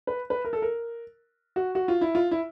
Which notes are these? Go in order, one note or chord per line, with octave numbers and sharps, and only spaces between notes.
B4
B4
A#4
A4
A#4
F#4
F#4
F4
E4
F4
E4